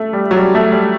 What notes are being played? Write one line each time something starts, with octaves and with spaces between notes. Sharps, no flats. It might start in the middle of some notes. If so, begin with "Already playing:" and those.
Already playing: A3
G3
F#3
G3
A3
G3